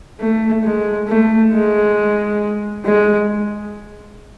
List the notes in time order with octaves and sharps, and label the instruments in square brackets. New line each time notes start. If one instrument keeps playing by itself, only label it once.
[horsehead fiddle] A3
G#3
A3
G#3
G#3